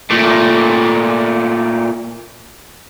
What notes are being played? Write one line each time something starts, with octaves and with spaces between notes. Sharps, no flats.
A#2 A3